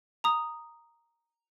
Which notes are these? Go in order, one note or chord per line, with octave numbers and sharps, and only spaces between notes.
A#5 D#6